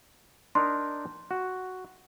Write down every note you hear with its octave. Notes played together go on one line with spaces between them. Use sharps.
D4 D#4 A#4 C6
F#4